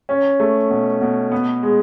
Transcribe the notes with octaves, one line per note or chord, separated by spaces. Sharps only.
C#4
A3
B2
B2
B3
G#3